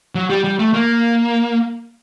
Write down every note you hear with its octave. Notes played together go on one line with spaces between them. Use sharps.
F#3
G3
G3
A3
A#3